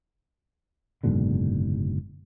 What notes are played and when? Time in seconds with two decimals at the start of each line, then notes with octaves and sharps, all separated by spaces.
1.04 F#1 G#2 B2 D3